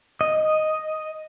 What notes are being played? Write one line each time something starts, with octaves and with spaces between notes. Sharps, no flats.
D#5